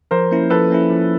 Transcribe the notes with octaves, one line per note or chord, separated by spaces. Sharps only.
F3 A#4 C5
A#3 C#4 E4
F3 A4 B4
A#3 C#4 E4
F3